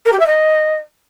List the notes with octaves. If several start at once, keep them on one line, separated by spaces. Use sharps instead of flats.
A#4
G4
E5
D#5